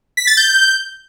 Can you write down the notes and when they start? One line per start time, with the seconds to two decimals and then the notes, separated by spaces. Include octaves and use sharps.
0.17 B6
0.27 A6
0.37 G6